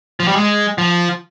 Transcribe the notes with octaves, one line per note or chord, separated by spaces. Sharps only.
F3
G3
G#3
F3